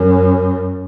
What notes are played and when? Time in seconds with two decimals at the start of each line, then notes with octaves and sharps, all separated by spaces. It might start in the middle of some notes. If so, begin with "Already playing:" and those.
Already playing: F#2